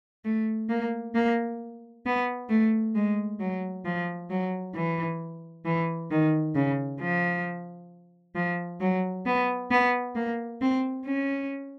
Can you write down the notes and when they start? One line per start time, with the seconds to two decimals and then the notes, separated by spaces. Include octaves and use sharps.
0.25 A3
0.69 A#3
1.15 A#3
2.05 B3
2.50 A3
2.95 G#3
3.40 F#3
3.85 F3
4.30 F#3
4.75 E3
5.65 E3
6.11 D#3
6.55 C#3
7.01 F3
8.35 F3
8.81 F#3
9.26 B3
9.71 B3
10.15 A#3
10.61 C4
11.06 C#4